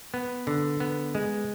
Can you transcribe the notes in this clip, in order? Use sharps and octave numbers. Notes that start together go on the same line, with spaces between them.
B3
D3
B3
G#3